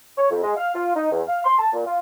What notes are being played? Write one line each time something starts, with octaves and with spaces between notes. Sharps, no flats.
C#5
F2
G#3
F5
F4
D#4
E2
F5
C6
A5
A#2
F4